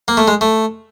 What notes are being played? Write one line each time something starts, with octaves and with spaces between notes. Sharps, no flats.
A#3
A3
G#3
A3